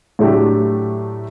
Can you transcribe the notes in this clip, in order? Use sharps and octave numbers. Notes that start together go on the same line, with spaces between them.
A2 F#3 A3 D4 G4